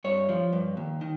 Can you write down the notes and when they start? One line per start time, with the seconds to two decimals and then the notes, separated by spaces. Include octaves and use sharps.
0.04 G2 C#5
0.29 F3
0.53 G2
0.77 D#2
1.01 D#3